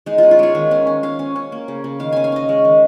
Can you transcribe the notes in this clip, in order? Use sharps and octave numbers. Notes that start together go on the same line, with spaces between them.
G#3 D#4
C#4 F4
F4
G#3 C#5
D#3
C#4
C#4
C#4 F5
C#4
C#4
A#3
C#3
C#3
D#3 F5
C#4 G#5
F5
C#4 D#5
G#3
D#3